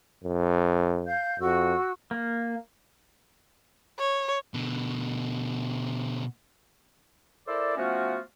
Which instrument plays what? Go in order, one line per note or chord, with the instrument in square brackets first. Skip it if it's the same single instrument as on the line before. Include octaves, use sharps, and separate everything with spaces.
[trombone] F2
[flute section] F5 G6
[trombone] F2 [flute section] F#4 E6
[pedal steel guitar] A#3
[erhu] C#5
[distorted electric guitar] B2 D3
[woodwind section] E4 A4 A#4 C5 D5
F3 A3 B3 C#4 F4 F#4